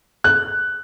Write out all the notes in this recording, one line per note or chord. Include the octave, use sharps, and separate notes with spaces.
F#6